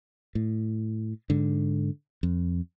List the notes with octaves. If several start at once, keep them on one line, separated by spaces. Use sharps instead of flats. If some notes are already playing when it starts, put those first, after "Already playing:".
A2
G#2 D3
F2